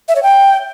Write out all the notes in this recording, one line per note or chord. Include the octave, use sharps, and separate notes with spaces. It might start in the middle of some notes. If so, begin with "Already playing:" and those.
E5
C#5
G5